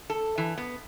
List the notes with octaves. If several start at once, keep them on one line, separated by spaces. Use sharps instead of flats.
A4
E3
B3